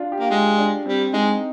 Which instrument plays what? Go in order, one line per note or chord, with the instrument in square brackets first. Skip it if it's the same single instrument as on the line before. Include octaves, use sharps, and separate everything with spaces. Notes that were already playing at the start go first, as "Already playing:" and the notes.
Already playing: [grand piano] D4 F4
G4
[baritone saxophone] A#3
[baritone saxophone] G#3 [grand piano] F4
[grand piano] D4
[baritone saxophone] G3 [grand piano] C4
[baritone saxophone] G#3 [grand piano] D#4